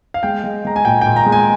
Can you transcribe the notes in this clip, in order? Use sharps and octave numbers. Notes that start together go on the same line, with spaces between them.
F5
G#3 G5
G#3
G#3 A#5
G#5
A#2 G5
G5
A#2
A#5
G#3
G#5